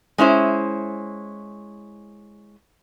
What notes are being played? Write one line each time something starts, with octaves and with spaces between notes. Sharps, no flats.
G#3 C#4 E4 C5